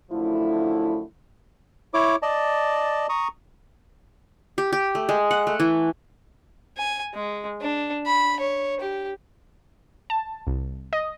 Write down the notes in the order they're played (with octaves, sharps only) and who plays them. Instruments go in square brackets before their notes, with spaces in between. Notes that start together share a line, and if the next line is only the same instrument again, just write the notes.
[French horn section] F#2 D3 F3 A3 E4
[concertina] E4 C#5 D6
D5 D#5 A5
A#5 C#6 D#6
[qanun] G4
G4
A3
G#3
F#5
A3
E3
[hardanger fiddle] G#5
G#3
D4
B5
C#5
G4
[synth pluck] A5
C2
D#5